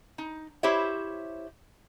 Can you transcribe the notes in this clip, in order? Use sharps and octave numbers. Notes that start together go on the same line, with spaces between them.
D#4
E4 G4 C5 C#5 E5